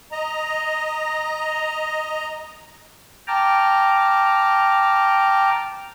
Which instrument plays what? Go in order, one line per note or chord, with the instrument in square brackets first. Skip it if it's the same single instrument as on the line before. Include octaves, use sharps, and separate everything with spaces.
[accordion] D#5 A#5
[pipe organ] G5 A5 A#5 D6 F6